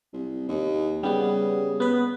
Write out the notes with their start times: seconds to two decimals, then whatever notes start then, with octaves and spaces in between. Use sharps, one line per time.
0.13 C2
0.49 D#2
1.03 C#3 G3 B3
1.80 B3 B4